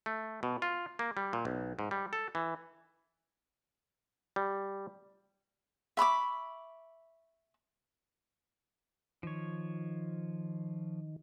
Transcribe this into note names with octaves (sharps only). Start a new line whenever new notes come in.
A3
B2
F4
A#3
G3
A#2
B1
G#2
G3
A4
E3
G3
E5 B5 C#6 D6
D#3 F3 C#5